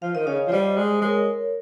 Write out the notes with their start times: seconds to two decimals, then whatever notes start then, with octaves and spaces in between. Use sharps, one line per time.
0.02 F3 F5
0.14 D#3 D#5
0.27 C#3 C#5 F5
0.47 F3
0.52 G3 C5 D#5
0.77 G#3
1.01 G#3 A#4 C#5